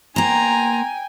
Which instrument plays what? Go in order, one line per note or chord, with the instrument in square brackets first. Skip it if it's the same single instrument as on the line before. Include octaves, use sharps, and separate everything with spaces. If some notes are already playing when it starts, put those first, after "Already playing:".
[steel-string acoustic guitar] A#3 C5 [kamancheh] G5 G#5 [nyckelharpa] A#5